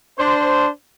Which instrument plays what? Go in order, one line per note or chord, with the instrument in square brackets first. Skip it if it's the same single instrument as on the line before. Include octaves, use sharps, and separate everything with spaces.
[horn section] D4 C5